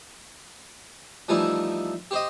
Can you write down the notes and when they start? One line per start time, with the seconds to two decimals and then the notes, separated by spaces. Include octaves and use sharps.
1.29 E3 F3 G3 A3 D#4 E4
2.11 G4 C5 D#5